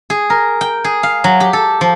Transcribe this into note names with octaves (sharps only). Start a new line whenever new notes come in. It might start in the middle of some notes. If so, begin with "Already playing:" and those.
G#4
A#4
G5
G#4
F5
F#3
G4
A4
F3